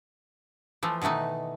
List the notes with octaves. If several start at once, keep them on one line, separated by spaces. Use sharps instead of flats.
E3 F3 A3
B2 D#3 E3 A3 D#4